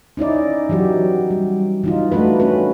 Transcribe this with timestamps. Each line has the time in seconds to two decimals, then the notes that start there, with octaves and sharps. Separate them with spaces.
0.17 C#4 D#4 E4 D5
0.69 E3 F#3 F#4 G4
1.31 G3
1.83 E3 D#4 F4
2.12 A3 D4 F#4 B4
2.40 C#4 B4